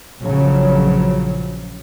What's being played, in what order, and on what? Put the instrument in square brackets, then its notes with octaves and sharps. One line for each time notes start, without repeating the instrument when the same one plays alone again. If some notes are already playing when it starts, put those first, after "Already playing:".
[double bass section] A#1 C#3 F3 F#3